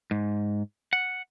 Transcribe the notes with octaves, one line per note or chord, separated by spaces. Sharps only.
G#2
F#5